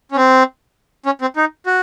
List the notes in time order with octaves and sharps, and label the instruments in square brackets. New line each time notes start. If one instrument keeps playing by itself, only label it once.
[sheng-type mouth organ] C#4
C4
C#4
C4
D#4
F#4